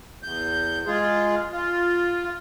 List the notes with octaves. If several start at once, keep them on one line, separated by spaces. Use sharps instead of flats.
E2 G6
G#3 F4 G#4
F4